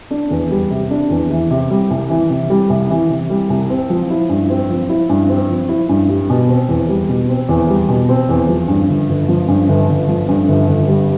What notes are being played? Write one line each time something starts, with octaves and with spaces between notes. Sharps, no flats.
D4
E2
G3
C3
D4
E2
E3
C3
G3
C2
E3
C3
G3
C2
E3
C3
G3
C2
C4
F3
E4
G2
C4
F3
E4
G2
C4
F3
E4
G2
G3
B2
C4
E2
G3
B2
C4
E2
G3
B2
C4
E2
F3
G2
G1
G1
F3
G2
G1
G1
F3
G2
G1
G1
G3